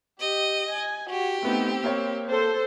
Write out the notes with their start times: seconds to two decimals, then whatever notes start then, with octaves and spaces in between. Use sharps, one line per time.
0.20 G4 D#5
0.68 G#5
1.10 F#4 G4
1.42 A3 B3 C4 D#4
1.84 A#3 C#5
2.28 A4 C5